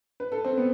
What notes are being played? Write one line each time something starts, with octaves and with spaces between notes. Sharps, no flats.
B4
A4
C4
B3